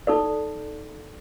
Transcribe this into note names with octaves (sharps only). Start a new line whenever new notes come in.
D#4 A4 D5